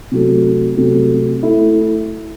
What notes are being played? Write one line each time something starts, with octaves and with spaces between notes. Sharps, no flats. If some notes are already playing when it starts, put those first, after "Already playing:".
C3 F#3 A3
C3 F#3 A3
A3 E4